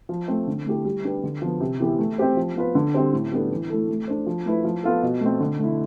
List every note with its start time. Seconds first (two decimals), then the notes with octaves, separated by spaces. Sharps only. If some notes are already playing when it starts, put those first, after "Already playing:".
0.09 F3
0.28 A3 C4
0.47 D3
0.66 A3 E4 G4
0.85 G3
1.04 D4 G4 B4
1.23 D3
1.42 F3 B3
1.60 C3
1.80 E3 B3 E4 G4
1.99 A3
2.18 C4 G4 C5
2.37 F3
2.56 B3 F4 B4
2.75 D3
2.94 G3 C4 G4 C5
3.13 A2
3.32 G3 B3 D4 A4
3.51 E3
3.70 A3 E4 A4
3.89 A3
4.08 D4 A4 C5
4.26 F3
4.46 A3 E4 B4
4.64 F3
4.84 B3 F4 A4
5.02 B2
5.21 A3 C4
5.40 D3
5.59 A3 E4